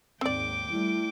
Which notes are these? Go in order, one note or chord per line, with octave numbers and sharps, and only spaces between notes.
D#2 G#2 C4 D5 G5 D6
G3 A3 E4